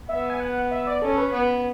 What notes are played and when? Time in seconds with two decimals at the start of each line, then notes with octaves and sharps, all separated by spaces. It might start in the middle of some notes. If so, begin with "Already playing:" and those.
0.09 B3 E5
0.30 G#5
0.40 F#5
0.71 E5
0.87 D5
1.02 C#4 A4
1.17 B4
1.32 B3